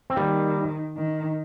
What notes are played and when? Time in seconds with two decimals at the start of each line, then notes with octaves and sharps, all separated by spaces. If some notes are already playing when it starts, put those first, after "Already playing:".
0.10 C4
0.16 D#3 G3 A#3
0.96 D#3